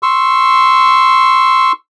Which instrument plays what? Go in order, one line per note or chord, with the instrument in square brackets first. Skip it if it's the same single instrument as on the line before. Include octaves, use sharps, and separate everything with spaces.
[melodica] C6 C#6 E6